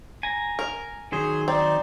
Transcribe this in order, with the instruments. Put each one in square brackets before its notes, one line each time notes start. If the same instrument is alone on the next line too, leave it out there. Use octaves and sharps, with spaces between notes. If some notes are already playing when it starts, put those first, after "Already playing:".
[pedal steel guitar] G#5 A#5
[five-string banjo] A#4
[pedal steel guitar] D#3 F#3 C5 [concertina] G#4 G#5
[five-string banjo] C4 [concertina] D#4 D5